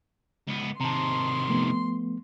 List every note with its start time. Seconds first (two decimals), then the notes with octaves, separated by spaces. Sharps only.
0.47 C#2 B3
0.81 C3 D#3 A5 A#5 C6
1.48 F3 A3 B3